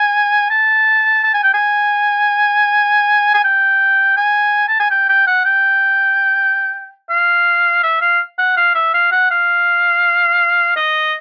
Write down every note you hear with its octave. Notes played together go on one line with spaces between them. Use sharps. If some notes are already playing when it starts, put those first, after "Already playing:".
Already playing: G#5
A5
A5
G#5
G5
G#5
G#5
G5
G#5
A5
G#5
G5
G5
F#5
G5
F5
E5
F5
F#5
F5
E5
F5
F#5
F5
D#5